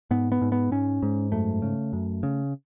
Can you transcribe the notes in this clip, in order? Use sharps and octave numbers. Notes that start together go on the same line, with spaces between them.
G#2 B3
B3
G#2
B3
G#2 C#4
G#2
F#2 A3
C#3
F#2
C#3